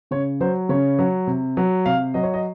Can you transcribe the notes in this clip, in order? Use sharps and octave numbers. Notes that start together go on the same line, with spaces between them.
C#3 C#5
F#3 C5
C#3 C#5
F#3
C3
F#3
C3 F5
F#3 D#5
C#5
D#5